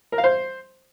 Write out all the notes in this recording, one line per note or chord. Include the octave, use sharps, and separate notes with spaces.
A#4
F5
C5